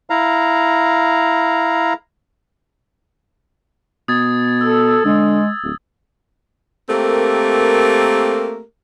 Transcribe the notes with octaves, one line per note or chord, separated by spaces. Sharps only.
E4 F5 A#5
B2 D#6 G#6 A6
A4 E6
D3 G#3
D1
A3 A#3 C4 G4 A#4